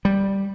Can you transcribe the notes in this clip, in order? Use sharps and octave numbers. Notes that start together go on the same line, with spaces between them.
G3